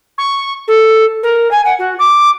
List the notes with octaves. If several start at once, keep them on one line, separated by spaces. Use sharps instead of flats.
C#6
A4
A#4
G#5
F#5
F#4
D6